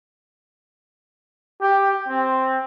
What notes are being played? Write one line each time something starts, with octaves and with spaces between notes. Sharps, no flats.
G4
C4